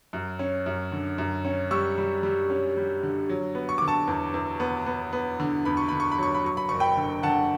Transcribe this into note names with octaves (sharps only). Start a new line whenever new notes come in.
F#2
C#4
F#2
D3
F#2
C#4
G3 C#6 E6
G3
G3
C#4
G3
D3
F#3
B3
C#6
D3 D6
A5 C#6
E2
E2
B3
B3
B3
D3
E2 B5
C#6
D3 B5
C#6
B5
F#3 C#6
B5
F#3 C#6
B5
F#1 C#6
G5 B5
D3
D3 F#5 A5